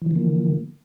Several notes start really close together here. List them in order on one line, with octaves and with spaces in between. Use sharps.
E3 F3 D3 A#3